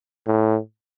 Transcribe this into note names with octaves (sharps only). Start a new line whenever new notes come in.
A2